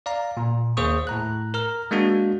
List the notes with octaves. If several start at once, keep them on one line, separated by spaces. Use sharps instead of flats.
D5 F5 A#5
A#2
D#2 A#3 G#4 C5 C#6 D#6
A2 A#5 F#6
A#4 A#5 F6
G#3 A#3 D4 F#4